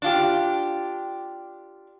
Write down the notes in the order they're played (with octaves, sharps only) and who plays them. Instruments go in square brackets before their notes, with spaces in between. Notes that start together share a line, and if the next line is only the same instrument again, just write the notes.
[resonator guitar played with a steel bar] D4 F4 G4